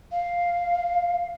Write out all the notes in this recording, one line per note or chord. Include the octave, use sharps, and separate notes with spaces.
F5